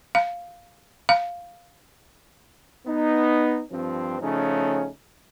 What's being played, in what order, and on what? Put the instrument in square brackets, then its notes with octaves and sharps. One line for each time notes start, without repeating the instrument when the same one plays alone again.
[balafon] F5
F5
[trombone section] B3 D#4
G2 F3 C4
C#3 F3 A3 C#4 D#4